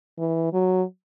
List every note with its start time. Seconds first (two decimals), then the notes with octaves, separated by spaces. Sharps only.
0.18 E3
0.53 F#3